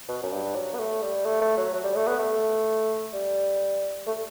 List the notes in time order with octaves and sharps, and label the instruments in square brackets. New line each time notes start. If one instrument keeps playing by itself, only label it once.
[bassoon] B2
F#2
G2
F#3
B3
A3
G3
A3
A3
F#3
F#3
G3
A3
B3
A3
G3
A3